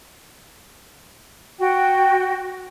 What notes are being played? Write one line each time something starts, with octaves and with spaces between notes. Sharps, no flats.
F#4 G5